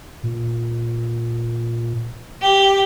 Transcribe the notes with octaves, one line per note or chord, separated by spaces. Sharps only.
A#2
G4